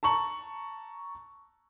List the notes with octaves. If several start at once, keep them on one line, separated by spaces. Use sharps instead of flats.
A5 A#5 C#6 F#7